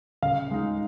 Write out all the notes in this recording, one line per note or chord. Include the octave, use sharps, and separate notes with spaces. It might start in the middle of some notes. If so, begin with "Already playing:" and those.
C#3 F5
G#3 D#4